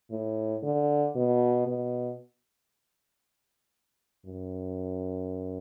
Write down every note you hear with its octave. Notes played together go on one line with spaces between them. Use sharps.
A2
D3
B2
B2
F#2